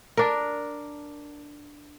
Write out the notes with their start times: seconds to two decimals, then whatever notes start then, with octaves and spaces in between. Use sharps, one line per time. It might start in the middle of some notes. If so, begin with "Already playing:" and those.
0.17 D4 A#4